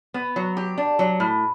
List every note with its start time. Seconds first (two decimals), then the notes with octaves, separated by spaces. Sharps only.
0.14 B3
0.36 F#3
0.57 G4
0.78 D4
0.99 F#3
1.20 A2